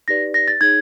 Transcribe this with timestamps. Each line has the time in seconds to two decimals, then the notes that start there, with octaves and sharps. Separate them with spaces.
0.08 D#4 G4 B4 D5 A#6
0.34 A#6
0.48 A6
0.61 D#4 G#4 C#5 G#6